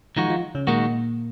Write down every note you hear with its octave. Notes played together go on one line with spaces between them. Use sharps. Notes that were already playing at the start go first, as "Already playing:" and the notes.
D#3 F3 G#3 D#4 F4 F#4
F3 F4
C#3 C#4
A#2 D#3 G#3 A#3 D#4 F#4